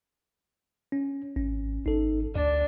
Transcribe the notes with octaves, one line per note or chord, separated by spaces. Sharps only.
C#4
G#1 C#4
G#1 D#4 A4
D2 D4 D5